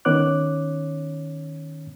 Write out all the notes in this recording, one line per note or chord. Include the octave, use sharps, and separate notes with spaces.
D#3 B3 C#4 C#5 D6 F#6